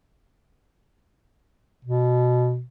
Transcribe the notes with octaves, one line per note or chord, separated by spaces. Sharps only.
B2